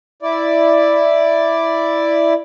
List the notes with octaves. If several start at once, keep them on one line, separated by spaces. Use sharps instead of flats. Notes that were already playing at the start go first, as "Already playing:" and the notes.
E4 D5